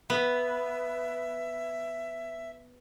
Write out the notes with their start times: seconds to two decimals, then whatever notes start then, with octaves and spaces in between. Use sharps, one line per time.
0.10 B3 E5